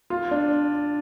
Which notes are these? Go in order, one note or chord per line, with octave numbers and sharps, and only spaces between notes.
F4
D4